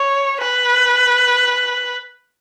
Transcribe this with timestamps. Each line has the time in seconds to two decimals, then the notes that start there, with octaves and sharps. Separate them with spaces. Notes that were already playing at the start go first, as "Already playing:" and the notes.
Already playing: C#5
0.41 B4